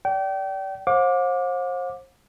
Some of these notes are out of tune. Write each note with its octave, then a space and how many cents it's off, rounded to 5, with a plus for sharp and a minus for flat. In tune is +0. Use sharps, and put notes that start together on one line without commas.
D5 -25 G5 -30
C5 +35 F5 +45 D6 +0